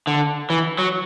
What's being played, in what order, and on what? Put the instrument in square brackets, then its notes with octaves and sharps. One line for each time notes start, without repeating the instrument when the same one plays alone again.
[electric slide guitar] D3
E3
F#3